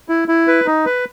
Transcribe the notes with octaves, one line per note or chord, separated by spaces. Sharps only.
E4
E4
B4
D#4
B4